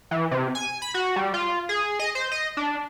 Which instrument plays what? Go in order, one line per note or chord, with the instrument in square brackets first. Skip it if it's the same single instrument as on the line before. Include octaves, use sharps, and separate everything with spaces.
[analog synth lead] E3
C3
G#5
B5
F#4
G3
F4
G#4
D#5
C5
D#5
D4